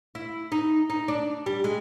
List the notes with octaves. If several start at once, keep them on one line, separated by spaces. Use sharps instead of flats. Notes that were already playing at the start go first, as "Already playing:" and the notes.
E4
D#4
D#4
D4
G3
G#3